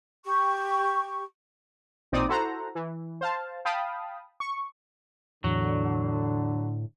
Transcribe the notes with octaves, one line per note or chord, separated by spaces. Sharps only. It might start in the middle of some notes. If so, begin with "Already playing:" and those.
G4 C#6
A1 A#2 C4 D#4 D5 D#6
E4 F#4 A4 C5 F#5 A#5
E3
C5 F5 A5
F5 G5 A5 B5 D#6
C#6
E2 A2 D3 F#3